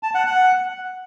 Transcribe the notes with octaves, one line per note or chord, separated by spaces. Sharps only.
A5
F#5
F#5